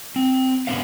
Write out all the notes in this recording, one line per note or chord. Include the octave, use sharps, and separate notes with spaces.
C4
B2 D3 G3 B3 C#4 F5